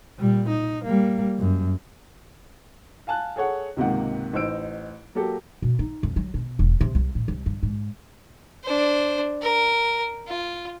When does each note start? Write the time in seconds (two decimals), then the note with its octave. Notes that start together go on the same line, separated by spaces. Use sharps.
0.19 A#2 G3
0.49 D#4
0.84 G3 A#3
1.39 F#2
3.07 F5 G#5 A5 F#6
3.36 G#4 A4 C#5 F#5
3.77 C#2 G#2 C3 D#3 A#3 F#5
4.33 A1 D#4 C5 E6 D7
5.15 F#3 A#3 G4 A4
5.62 B2
5.79 D#4
6.03 F2
6.16 F#3
6.34 B2
6.59 E1
6.81 C3
6.95 C2
7.15 A2
7.28 C2
7.46 G2
7.63 G#2
8.64 D4 C5
9.42 A#4
10.27 F4